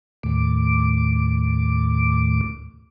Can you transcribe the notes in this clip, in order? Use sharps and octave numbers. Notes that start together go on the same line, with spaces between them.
D#2 A2 D6